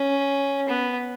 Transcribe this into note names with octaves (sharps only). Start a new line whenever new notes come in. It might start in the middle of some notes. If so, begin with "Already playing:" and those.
Already playing: C#4
B3